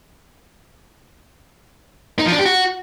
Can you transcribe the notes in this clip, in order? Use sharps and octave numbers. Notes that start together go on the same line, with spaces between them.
D#4
F3
D4
G4
F#4